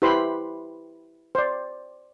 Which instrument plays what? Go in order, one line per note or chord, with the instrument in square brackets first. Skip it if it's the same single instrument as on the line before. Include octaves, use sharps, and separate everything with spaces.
[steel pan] E4 G4 B4 C5 B5 C6
C5 D5